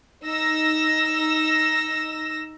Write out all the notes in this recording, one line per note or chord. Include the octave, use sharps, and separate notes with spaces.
D#4 E6 A#6